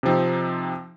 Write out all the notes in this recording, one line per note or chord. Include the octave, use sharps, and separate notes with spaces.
C3 F3 C4 D#4